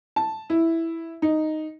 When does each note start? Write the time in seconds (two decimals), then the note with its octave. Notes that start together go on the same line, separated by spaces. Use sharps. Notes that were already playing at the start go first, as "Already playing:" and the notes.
0.16 A5
0.50 E4
1.22 D#4